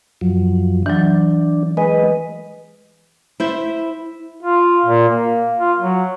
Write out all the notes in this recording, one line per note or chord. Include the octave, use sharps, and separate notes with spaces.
F#2 F3 F#3
E3 F#3 D4
G#3 B4 D#5 G#5
E4 C5 E5
F4
A#2
A#3
F4
F#3